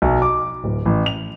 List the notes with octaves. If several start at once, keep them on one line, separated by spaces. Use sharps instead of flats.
B1
D6
D1
A1
F7